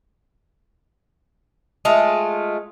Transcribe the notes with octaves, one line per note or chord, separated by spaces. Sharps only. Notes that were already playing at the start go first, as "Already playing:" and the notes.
G#3 A3 F4